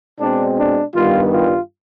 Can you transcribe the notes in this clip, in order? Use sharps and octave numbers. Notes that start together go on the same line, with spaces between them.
B2 G#3 C4 D4
D4
G2 D#3 G3 B3 F4
F4